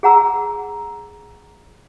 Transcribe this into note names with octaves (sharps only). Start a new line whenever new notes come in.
G#4 F#5 A#5 E6